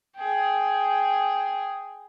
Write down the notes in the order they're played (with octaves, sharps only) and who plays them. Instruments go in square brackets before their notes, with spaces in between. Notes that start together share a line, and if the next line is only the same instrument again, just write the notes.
[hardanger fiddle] G#4 G5